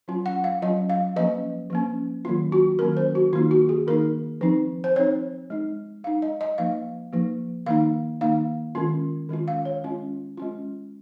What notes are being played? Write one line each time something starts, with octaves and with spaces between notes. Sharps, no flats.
F#3 C#4 F4
F#5
F5
F#3 C#4 F4 D#5
F5
F3 A#3 C#4 D#5
F3 A#3 C#4
D#3 F#3 A#3 C#4 F4
F#4
D#3 F#3 A#3 C#4 F4 A#4
C5
F#4
D#3 A#3 D#4 F4
F#4
G#4
D#3 A#3 D#4 A#4
F3 C4 D#4
C5
F3 C4 D#4 C#5
G#3 D#4
G#3 D#4 F5
D#5
D#5
F3 A#3 D#4 F5
F3 A#3 D#4
D#3 A#3 D#4 F5
D#3 A#3 D#4 F5
D#3 G#3 C#4 F4
D#3 G#3 C#4 F4
F5
C#5
G#3 C#4 F4
G#3 C#4 F4